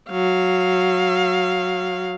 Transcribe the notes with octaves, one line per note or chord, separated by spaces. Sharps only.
F#3 F5